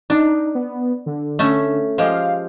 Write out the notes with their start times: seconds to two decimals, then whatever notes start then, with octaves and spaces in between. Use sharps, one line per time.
0.10 D4 D#4
0.55 B3
1.06 D3
1.39 A3 C#4 E5
1.98 F3 G#3 G4 F5